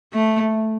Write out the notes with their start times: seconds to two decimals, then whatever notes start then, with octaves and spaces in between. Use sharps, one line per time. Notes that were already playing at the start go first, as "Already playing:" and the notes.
0.13 A3